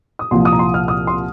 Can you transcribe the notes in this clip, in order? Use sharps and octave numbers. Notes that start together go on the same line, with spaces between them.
D#6
C2 A#2 F3 C6
D#6
A#5
C6
F6
D#6
C6